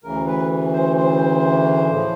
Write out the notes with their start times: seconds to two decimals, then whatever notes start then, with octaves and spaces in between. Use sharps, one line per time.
0.04 D2 C#3 E3 A#4
0.27 B4
0.73 C5
0.97 C5
1.89 A2 F3